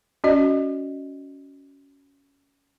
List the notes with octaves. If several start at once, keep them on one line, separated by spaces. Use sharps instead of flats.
C#4 F#4 D5 D#5